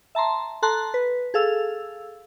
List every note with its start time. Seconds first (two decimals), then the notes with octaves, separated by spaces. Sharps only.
0.15 E5 A5 A#5 C6
0.62 A4 A5 A#5 C6 F#6
0.94 B4
1.34 G#4 A4 F5 E6